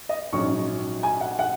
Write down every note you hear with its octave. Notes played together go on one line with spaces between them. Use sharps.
D#5
A#1 G#2 F#3 C#4 C#6
G#5
F#5
F#5